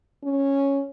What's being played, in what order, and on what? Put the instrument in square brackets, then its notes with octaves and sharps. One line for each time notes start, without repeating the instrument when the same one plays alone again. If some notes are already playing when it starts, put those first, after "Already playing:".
[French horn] C#4